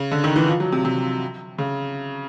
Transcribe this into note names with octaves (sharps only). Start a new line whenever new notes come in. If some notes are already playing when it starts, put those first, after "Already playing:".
Already playing: C#3
D3
D#3
E3
F3
F#3
C3
C3
C#3